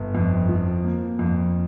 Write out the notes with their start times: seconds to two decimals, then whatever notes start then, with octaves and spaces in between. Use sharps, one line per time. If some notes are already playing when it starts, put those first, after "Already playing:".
Already playing: G1
0.15 F2
0.49 F3
0.84 A#3
1.19 F2